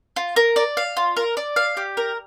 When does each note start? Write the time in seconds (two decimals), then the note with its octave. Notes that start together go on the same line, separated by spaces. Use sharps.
0.16 F4
0.36 A#4
0.56 D5
0.77 F5
0.97 F4
1.17 A#4
1.37 D5
1.56 F5
1.77 G4
1.97 A#4